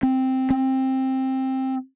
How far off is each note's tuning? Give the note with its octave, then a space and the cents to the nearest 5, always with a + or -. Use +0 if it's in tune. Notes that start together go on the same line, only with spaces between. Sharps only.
C4 +0
C4 +15